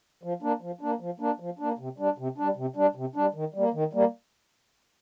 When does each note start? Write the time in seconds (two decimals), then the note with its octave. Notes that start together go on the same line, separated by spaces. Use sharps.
0.23 F3
0.42 A#3 D4
0.61 F3
0.81 A#3 D4
1.00 F3
1.20 A#3 D4
1.40 F3
1.59 A#3 D4
1.79 C3
1.98 G3 D4
2.18 C3
2.38 G3 D4
2.56 C3
2.76 G3 D4
2.95 C3
3.16 G3 D4
3.34 D#3
3.54 G3 A#3
3.74 D#3
3.93 G3 A#3